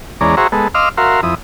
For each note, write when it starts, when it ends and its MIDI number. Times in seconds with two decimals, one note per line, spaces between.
0.21 0.35 40
0.21 0.35 56
0.21 0.35 61
0.21 0.35 74
0.21 0.35 82
0.37 0.47 66
0.37 0.47 68
0.37 0.47 72
0.37 0.47 76
0.37 0.47 82
0.37 0.47 85
0.52 0.68 56
0.52 0.68 59
0.52 0.68 69
0.75 0.89 75
0.75 0.89 77
0.75 0.89 84
0.75 0.89 86
0.75 0.89 88
0.75 0.89 89
0.97 1.21 66
0.97 1.21 70
0.97 1.21 76
0.97 1.21 77
0.97 1.21 84
1.23 1.35 41
1.23 1.35 64
1.23 1.35 87